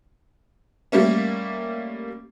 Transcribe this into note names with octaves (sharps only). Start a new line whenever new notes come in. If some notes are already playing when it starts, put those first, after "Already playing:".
G3 A3 A#3 C#4